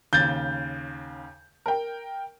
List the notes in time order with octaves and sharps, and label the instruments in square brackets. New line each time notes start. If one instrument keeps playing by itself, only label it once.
[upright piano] D#2 C#3 [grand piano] G6 A6
[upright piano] A#4 G5